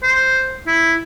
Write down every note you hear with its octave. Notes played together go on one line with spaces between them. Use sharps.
C5
E4